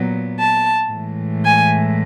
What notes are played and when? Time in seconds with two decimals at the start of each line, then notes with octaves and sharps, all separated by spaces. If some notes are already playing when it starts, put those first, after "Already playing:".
Already playing: A#2 F#3 B3
0.38 A5
0.91 A2 E3 G#3
1.45 G#5